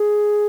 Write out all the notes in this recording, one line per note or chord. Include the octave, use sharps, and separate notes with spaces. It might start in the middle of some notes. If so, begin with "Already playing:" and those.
Already playing: G#4